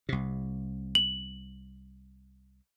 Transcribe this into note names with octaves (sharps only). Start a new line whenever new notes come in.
C2 C3
F#7